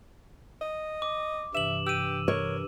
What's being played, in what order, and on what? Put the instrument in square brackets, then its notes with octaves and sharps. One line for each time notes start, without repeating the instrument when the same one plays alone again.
[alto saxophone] D#5
[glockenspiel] D6
[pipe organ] G2 C3 E3 [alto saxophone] E5 [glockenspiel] E7 F#7
[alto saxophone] G4 [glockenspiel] E6 D#7
[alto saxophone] A#4 [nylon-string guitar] C#5